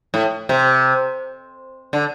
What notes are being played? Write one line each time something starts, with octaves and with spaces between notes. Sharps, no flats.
A2
C3
D3